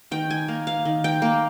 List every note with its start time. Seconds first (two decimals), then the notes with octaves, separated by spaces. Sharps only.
0.11 D#3 G5
0.30 G#5
0.48 A#3
0.67 F5
0.85 D#3
1.04 G5
1.22 A#3